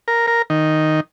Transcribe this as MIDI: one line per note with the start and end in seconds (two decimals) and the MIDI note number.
0.08 0.26 70
0.27 0.42 70
0.50 1.00 51